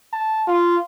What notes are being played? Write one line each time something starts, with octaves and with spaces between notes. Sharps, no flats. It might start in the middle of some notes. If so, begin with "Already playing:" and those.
A5
F4